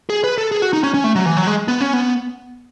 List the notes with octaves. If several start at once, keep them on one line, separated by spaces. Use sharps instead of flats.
G#4
B4
A4
G#4
F#4
D#4
C#4
C#4
A3
F#3
E3
F#3
G#3
B3
C#4
B3